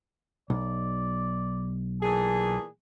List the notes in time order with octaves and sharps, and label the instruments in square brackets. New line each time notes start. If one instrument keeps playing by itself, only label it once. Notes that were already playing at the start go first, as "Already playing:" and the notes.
[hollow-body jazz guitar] B1 [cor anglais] D5
[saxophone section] A#2 E3 G#4 [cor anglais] A4